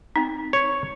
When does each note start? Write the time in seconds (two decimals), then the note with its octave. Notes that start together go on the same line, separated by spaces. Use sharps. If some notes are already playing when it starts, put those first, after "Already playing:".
0.16 C4 D#4
0.53 C#5